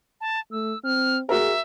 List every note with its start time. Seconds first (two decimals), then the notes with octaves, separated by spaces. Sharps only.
0.21 A5
0.52 A3 E6
0.84 C4 F6
1.29 F#4 G#4 A#4 E5